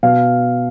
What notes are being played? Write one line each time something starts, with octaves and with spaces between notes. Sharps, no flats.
B2 F5